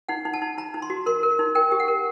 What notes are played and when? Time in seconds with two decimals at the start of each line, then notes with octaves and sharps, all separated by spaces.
0.09 D#4 F#5
0.25 D#4
0.33 A5
0.42 D#4
0.58 D#4 A#5
0.74 D#4
0.82 C6
0.90 F#4
1.06 A#4 C6
1.23 A#4
1.39 D#4
1.55 A#4 G5
1.72 G4
1.80 F#5
1.88 A#4